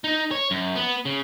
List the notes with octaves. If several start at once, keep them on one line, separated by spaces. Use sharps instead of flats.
D#4
C#5
F#2
B3
C#3